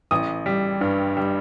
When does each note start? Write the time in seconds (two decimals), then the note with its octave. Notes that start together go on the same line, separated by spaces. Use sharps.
0.11 A1 D#6
0.46 G3
0.81 G2
1.17 G3